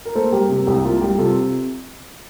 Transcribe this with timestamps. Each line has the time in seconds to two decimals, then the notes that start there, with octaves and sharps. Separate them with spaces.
0.05 A#4
0.15 A#3 A4 C5
0.32 G3 G4 A#4
0.49 C3
0.67 C2 G4
0.84 A#3 F4
1.01 G3 G4
1.18 C3 F4 A4